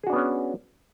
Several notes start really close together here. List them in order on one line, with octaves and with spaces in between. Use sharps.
G#4 F#4 D4 B3 C#4